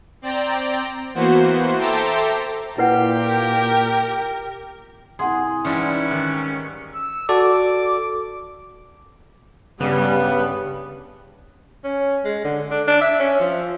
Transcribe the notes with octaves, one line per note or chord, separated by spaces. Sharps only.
C4 D5 G5 A#5
E3 A#3 B3 F#4 C5
A4 C5 E5 G5 A#5 D6
A#2 E4 G4 B4 F#5
A#4
C2 G#4 F#5 C6
G#2 E3 G3 C#4 D4
D#3 F#6
E6
F#4 A4 D5 D6
G2 C#3 G3 B3
C#4
G#3
D3
D4
D4
E5
C#4
F3